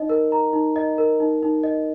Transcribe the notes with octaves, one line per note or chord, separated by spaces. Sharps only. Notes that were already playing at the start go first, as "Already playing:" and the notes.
Already playing: D#4 D#5
A#4
A#5
D#4
D#5
A#4
D#4
D#4
D#5